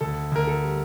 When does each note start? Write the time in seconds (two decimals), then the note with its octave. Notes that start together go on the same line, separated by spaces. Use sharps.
0.01 D2 A4
0.32 D2 A#4
0.47 A4
0.63 G3